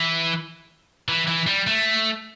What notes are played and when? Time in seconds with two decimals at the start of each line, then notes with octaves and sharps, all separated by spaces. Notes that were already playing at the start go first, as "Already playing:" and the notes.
Already playing: E3
1.08 E3
1.27 E3
1.47 G3
1.67 A3